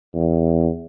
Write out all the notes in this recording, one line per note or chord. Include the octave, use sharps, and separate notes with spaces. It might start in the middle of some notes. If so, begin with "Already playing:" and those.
E2